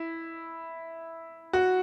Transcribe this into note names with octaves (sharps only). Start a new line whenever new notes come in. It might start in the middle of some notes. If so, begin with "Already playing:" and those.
Already playing: E4
F#4